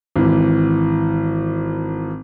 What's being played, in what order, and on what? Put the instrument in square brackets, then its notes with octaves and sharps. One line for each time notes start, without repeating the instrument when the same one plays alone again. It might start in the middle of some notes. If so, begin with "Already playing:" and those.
[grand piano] G#1 E3